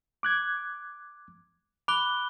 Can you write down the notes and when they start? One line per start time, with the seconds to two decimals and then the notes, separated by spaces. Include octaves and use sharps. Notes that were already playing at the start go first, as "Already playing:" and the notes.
0.23 D6 F#6 G#6
1.88 B5 D6 F#6 G7